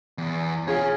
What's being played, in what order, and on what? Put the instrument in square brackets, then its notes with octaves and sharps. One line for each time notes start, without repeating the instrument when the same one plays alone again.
[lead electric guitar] E2
[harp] F4 G#4 [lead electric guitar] C#5 F5